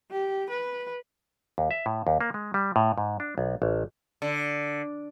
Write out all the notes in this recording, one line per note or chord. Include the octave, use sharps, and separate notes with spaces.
G4
B4
D#2
E5
A2
D#2
A#3
G#3
G3
A2
G#2
D4
B1
A1
D3